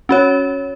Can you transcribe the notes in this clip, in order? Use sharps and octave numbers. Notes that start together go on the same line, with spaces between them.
C#4 F#4 C#5